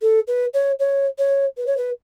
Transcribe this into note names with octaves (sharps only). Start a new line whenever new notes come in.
A4
B4
C#5
C#5
C#5
B4
C#5
B4